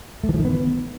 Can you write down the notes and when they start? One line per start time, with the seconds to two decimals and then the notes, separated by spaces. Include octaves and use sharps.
0.24 A3
0.29 E3
0.34 F3
0.39 D#3
0.45 B3